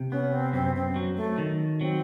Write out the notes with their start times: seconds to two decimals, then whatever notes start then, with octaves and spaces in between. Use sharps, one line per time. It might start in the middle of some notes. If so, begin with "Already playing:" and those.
Already playing: C3
0.12 B3 C#4
0.32 C4
0.53 F#2 C4
0.75 C4
0.96 F#3
1.17 A3
1.38 D#3
1.80 F#3 C4